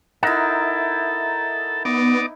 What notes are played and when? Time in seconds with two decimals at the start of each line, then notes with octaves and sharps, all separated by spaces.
0.23 D#4 E4 A4 A#4 E5 F#5
1.85 B3 D#4 D5 D6